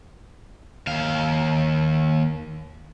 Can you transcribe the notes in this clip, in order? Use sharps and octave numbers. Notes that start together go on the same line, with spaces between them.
D#2 F5